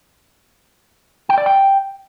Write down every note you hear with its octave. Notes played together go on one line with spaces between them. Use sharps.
G5
D5
G5